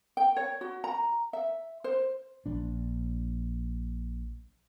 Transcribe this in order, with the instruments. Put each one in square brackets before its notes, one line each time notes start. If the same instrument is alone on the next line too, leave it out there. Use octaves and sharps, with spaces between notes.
[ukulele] G5
C#5
F#4
A#5
E5
C5
[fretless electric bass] A#1 D4